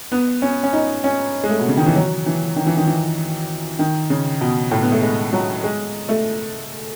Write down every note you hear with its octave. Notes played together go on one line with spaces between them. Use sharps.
B3
C#4
C#4
D#4
C#4
G#3
A3
B2
C#3
D#3
E3
F#3
E3
D#3
E3
D#3
E3
D#3
C#3
B2
A2
B3
A3
G#3
F#3
G#3
A3